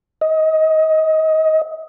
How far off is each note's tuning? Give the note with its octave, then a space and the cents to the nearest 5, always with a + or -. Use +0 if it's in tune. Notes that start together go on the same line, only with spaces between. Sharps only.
D#5 +25